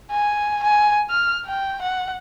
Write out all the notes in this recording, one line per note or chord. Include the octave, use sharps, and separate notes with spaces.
G#5
G#5
F6
G5
F#5